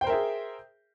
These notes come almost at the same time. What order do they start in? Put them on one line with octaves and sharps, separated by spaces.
G5 C5 A#4 E5 G#4